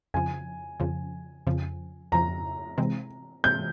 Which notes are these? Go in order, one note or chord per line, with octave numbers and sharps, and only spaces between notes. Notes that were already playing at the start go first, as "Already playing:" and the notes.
F2 C#3 F3 G#5
F2 C#3 F3
F2 C#3 F3
F2 C#3 F3 A#5
C3 E3 G#3 C4
C3 E3 G#3 C4 G6